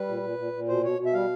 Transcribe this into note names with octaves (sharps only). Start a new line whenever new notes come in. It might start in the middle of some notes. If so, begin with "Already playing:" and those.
Already playing: G3 B4
A#2
A#2
A#2
A#2
B2 C5
B2 C#5
B2
E5
G3 F5